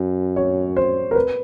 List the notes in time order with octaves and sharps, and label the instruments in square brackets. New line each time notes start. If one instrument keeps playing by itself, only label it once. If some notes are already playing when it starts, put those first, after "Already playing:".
Already playing: [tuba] F#2
[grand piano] C#5
C5
A#4
B4